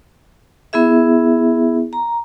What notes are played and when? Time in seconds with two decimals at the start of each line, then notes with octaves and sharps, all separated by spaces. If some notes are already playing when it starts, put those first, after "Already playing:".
0.73 B3 E4 G#4 E5
1.93 A#5